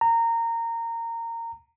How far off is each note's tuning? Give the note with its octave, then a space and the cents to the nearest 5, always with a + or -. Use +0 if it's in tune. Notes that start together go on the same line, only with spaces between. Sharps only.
A#5 -20